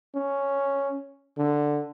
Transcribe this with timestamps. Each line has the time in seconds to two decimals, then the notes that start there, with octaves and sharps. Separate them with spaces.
0.15 C#4
1.38 D3